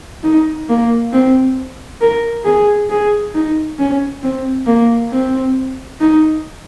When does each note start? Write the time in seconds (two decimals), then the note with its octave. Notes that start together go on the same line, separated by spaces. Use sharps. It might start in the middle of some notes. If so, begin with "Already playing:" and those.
0.23 D#4
0.69 A#3
1.13 C4
2.01 A#4
2.45 G#4
2.90 G#4
3.34 D#4
3.79 C#4
4.23 C4
4.66 A#3
5.11 C4
6.00 D#4